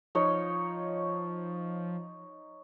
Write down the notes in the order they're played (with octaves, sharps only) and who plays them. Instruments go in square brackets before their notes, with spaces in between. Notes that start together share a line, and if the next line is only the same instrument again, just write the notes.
[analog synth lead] F3 [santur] D#4 C#5